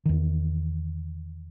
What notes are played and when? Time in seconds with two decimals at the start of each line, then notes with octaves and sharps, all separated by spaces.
0.06 E2 D#3